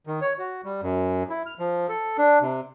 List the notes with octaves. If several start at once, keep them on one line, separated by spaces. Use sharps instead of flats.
D#3
C#5
F#4
G3
F#2
E4
F6
F3
A4
D4
C3